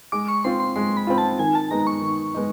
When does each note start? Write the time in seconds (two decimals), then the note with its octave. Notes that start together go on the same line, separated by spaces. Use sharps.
0.12 G#3 D6
0.28 C#6
0.44 C4 F4 C6
0.60 C6
0.76 G#3 C6
0.97 B5
1.07 C4 F4
1.18 A5
1.39 D#3 G#5
1.55 A5
1.71 G#3 B3 D#4 A#5
1.87 C#6
2.02 D#3
2.34 G#3 B3 D#4